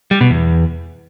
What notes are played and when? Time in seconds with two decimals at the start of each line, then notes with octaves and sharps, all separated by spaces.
0.11 G3
0.21 B2
0.30 E2